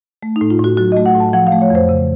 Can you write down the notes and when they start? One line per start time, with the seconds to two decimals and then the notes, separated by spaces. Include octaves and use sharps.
0.23 A3
0.36 D#4
0.41 A2
0.50 F4
0.59 A2
0.64 F#4
0.77 F#3 F#4
0.92 D#5
0.97 A3
1.06 F#5
1.15 A2
1.20 A5
1.33 F3 F#5
1.47 F5
1.52 A3
1.61 C#5
1.70 F2 C5
1.89 C#3